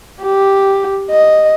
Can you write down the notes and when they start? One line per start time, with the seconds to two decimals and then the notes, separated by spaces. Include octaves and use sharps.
0.22 G4
1.11 D#5